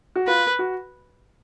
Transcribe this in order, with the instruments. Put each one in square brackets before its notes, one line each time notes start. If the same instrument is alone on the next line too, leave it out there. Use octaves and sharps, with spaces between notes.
[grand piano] F#4
[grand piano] F4 [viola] B4
[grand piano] F#4